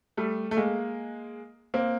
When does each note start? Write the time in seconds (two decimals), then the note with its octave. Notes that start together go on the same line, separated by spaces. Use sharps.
0.17 G3 A3
0.51 A3
0.57 G#3 A#3
1.74 A#3 C4